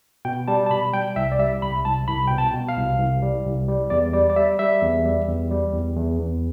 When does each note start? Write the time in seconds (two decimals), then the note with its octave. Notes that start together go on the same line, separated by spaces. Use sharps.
0.25 B2 G5
0.48 G3 A5
0.66 A5
0.71 B2 B5
0.94 G3 G5
1.16 C2 E5
1.32 D5
1.39 G3 E5
1.62 C2 B5
1.85 C2 A5
2.08 C2 B5
2.28 B2 G5
2.38 A5
2.53 B2
2.69 F5
2.76 C2
2.99 C2
3.22 G3
3.45 C2
3.68 G3
3.90 E2 D5
4.13 G3 D5
4.30 D5
4.36 G3 E5
4.59 G3 E5
4.82 E2
5.05 G3
5.28 E2
5.50 G3
5.73 E2
5.96 E2
6.19 E2